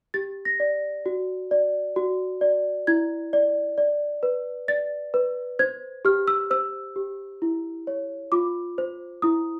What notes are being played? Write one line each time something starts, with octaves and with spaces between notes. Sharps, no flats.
G4 A6
A#6
D5
F#4
D5
F#4
D5
E4 G#6
D5
D5
B4
D5 A6
B4
C5 G#6
G4 F6
E6
C5 E6
G4
E4
C#5
F4 D6
C5
E4 D#6